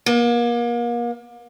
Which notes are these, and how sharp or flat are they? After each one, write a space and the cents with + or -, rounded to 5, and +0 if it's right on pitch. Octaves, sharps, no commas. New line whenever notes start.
A#3 +35